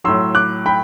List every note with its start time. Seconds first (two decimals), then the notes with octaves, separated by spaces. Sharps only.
0.04 A2 F#3 C6 E6
0.35 D6 F#6
0.66 G5 B5